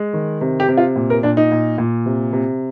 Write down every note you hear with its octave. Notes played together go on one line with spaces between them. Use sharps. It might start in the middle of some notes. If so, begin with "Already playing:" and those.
Already playing: G#3
D#3
C3
G4
C3
F4
A#2
A#4
A#2 D4
D#4
A#2
A#2
C3
C3